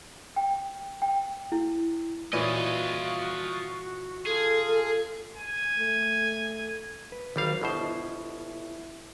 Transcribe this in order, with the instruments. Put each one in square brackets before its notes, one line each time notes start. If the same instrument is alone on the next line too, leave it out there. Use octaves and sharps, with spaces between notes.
[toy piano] G5
G5
E4
[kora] A#2 E3 C#5 [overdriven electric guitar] F4 D#5 [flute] F#4
[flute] F4 [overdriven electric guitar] G#4 [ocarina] A4
[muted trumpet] G#5
[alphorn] A3
[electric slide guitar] B4
[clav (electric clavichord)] G#1 G3 F5 [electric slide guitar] D#3 F#3
[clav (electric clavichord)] G1 B2 C5 [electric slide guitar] E4 D#5 A5